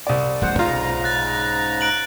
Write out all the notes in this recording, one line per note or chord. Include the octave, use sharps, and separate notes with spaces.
C2 D5
D1 A#1 G#3 C5 F#5
B1 G#2 C#3 F4 A#5
F#6 A6
F#6 D7 F#7